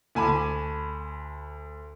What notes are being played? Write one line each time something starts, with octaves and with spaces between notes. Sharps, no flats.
D2 G#5 A5 B5 D6